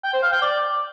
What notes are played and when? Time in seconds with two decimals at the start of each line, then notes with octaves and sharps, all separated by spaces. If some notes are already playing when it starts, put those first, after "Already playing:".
0.04 G5
0.13 C5
0.23 F5
0.32 G5
0.41 D5